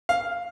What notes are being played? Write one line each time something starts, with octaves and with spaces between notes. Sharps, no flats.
F5